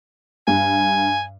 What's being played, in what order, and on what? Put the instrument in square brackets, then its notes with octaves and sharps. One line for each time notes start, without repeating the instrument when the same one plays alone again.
[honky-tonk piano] G2 [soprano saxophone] G#5